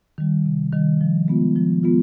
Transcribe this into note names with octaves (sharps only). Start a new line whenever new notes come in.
D#3 G3
C3
D#3 G3
F3
G#3 B3 F4
F3
G#3 B3 F4